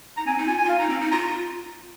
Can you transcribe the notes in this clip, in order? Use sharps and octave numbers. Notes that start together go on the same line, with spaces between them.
D#4 A#5
C4 G#5
D#4
F4 G#5
G#5
F4
F5
D#4 A#5
C4
D#4
F4 A#5